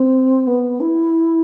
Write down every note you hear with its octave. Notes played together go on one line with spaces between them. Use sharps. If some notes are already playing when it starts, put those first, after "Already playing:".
Already playing: C4
B3
E4